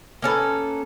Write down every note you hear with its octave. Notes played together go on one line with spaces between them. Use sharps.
A#3 C#4 A4 B4